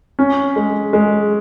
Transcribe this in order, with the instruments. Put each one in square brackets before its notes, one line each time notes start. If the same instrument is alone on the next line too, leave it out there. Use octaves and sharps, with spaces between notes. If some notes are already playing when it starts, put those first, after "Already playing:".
[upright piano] C#4
G#3
G#3